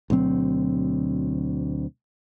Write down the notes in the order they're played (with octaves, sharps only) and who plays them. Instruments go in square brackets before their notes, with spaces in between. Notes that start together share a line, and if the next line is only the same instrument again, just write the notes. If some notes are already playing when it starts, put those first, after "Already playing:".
[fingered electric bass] D2 B2 F#3 C4